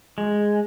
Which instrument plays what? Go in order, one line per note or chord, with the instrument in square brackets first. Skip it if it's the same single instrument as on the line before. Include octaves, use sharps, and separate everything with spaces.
[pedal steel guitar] G#3